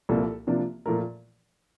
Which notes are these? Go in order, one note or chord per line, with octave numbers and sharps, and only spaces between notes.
C2 A#2 F3 A#3 A4
C3 F3 A#3 D4
A#2 F3 A3 A#4